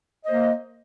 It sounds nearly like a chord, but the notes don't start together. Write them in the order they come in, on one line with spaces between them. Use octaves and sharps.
D#5 C5 A#3